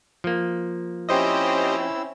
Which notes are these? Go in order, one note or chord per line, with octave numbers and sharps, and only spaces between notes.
F3 A#3
C4 C#4 E4 G4 C5 D#5 E6